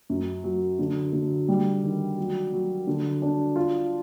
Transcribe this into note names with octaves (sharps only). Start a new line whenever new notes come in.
F#2
F#3
D3
D3
G3
D#3
F#3
F#3
D3
D4
F4